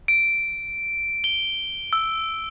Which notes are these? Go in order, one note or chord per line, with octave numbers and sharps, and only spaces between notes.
D7
G7
E6